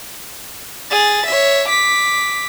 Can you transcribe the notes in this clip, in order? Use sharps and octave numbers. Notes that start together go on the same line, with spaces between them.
G#4 A6
C#5 E5
D6 B6